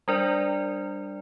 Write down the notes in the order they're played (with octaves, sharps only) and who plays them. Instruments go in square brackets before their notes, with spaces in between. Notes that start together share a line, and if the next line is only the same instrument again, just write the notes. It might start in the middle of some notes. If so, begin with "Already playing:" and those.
[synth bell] G3 D4 A#4 D5